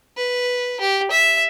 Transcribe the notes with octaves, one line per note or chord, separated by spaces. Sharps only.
B4
G4
E5